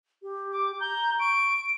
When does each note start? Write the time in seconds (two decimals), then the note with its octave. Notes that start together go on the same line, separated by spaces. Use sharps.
0.23 G4
0.52 D6
0.80 A#5 G6
1.19 C#6 D7